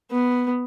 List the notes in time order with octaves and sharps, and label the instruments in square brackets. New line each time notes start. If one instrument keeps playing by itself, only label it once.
[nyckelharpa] B3